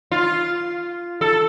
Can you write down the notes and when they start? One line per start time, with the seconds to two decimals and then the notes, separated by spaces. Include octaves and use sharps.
0.11 F4
1.21 A4